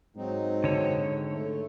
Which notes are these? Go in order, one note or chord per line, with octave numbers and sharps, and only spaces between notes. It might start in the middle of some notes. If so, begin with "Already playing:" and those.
G#2 F#3 C4 D#4
D3 C#5
A3